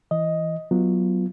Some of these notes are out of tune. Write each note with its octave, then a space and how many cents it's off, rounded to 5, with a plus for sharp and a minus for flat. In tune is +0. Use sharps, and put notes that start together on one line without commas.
E3 +0 D#5 +5
F#3 +0 B3 +0 F4 -10